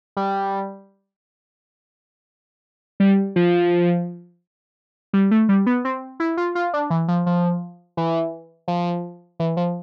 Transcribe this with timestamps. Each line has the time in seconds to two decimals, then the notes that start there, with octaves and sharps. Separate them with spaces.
0.17 G3
3.00 G3
3.36 F3
5.13 G3
5.31 A3
5.49 G3
5.66 B3
5.85 C4
6.20 E4
6.37 F4
6.55 F4
6.74 D4
6.90 E3
7.08 F3
7.26 F3
7.97 E3
8.68 F3
9.40 E3
9.57 F3